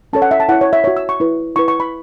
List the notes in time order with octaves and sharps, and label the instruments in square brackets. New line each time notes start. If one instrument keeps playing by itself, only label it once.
[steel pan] C#4 A4 C#5 A5
F#5
E5
A5
E4 C#5 F#5
C#5
E5
F#4 C#5 E5
E6
C#6
E4 B4
E4 B4 C#6
C#6
B5